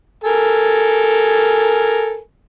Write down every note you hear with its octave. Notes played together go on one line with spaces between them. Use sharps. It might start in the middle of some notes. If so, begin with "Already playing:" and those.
A4 A#4 G#5